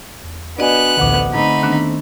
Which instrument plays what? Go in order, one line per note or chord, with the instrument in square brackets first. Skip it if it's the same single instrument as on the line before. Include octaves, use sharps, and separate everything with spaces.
[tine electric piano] E2
[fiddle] B3 F#6 [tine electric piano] D4 F#4 G#5 [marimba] D5 D#5
[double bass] A1 D2 [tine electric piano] D3 F#5 D6
[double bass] A3 C4 [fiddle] D#4 B5
[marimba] D#3 B3 D4